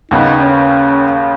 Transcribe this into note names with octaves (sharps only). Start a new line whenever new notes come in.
D#2 C#3 B3 D#4
C#4